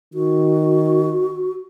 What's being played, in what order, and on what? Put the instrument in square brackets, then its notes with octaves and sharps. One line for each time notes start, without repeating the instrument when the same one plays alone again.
[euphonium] D#3 [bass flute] F#4